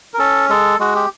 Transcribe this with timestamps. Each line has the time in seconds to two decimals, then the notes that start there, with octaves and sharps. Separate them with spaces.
0.14 A#4
0.19 C#4 A4
0.50 G#3 A4
0.79 G#3 F#4
0.95 G4